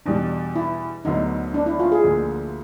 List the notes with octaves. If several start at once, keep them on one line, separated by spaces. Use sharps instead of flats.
E2 B2 G3 D4
E4
D2 D3 F#3 B3 D#4
D4
E4
F4
G#4
D2 D3 F3 A#3